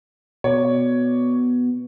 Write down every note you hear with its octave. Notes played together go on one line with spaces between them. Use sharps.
B2 C#5 D5